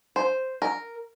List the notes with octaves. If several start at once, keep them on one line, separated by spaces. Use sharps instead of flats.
C5
A#4